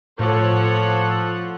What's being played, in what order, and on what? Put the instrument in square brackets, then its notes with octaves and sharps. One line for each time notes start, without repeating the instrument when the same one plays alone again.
[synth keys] A2 D6 [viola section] F3 C#5 F#5 [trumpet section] A4